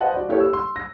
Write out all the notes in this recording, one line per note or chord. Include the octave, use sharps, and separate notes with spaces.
B4 C5 D#5 F5 F#5 A5
F#4 D5
A#3 E4 G4 A4 B4 C#5
E6
C6
A#6